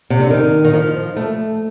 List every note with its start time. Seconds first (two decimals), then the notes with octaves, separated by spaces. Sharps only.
0.10 C3
0.20 D3
0.30 D#3
0.65 D#3
0.73 F3
1.16 A3